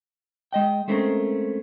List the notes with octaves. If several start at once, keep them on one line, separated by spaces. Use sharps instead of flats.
G#3 D#5 G5
G#3 A3 C4 C#4 A#4